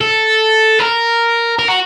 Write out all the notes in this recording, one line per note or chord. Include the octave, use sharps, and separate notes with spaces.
A4
A#4
A#4
F#4